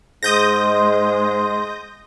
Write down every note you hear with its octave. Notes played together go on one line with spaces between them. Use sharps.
G#2 G#3 D#6 G6 A#6